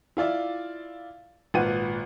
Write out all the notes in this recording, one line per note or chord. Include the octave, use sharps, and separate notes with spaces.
E4 F4 D5 E5
G#1 A#2 B4 F#5 D#7